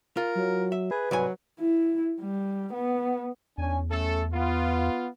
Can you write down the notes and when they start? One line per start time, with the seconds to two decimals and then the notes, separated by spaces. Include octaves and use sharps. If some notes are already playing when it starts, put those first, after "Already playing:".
0.17 F4 A#4
0.35 F#3
0.72 E5
0.91 G#4 B4
1.11 C2 G#2 F#3 G#5
1.59 E4
2.21 G3
2.74 B3
3.58 E2 C#4 D4 G#5
3.91 A3 C#4 A4
4.33 B3 F4